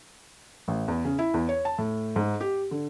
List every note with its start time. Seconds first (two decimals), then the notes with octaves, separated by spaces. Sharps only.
0.68 A1
0.88 E2
1.05 C#3
1.19 E4
1.34 E2
1.49 C#5
1.65 A5
1.78 A2
2.16 G#2
2.41 G4
2.71 D3